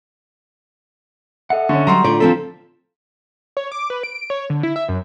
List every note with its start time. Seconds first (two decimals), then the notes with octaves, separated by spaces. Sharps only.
1.50 A4 D#5 E5 F#5
1.69 D3 C#4 C#6
1.87 F#3 G3 A#5 C6
2.04 A2 D3 F4 D5
2.20 F3 C4 A4 B6
3.57 C#5
3.72 D6
3.90 B4
4.03 D7
4.30 C#5
4.50 D3
4.63 E4
4.76 E5
4.89 F#2